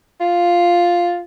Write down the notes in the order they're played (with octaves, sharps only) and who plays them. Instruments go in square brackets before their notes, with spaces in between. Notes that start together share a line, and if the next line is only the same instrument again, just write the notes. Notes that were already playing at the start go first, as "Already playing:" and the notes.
[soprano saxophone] F4